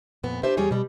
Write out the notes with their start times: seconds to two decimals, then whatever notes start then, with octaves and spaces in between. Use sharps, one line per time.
0.23 F2 A#2 B3
0.43 D4 G4 B4 C5 E5
0.57 E2 G3 G4 G#4 C#5
0.71 B2 G3